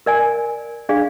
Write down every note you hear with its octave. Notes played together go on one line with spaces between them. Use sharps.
A#4 D5 G#5
D4 G#4 D5 F5